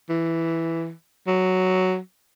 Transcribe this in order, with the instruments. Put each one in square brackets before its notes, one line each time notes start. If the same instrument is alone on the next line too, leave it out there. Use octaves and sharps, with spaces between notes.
[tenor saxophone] E3
F#3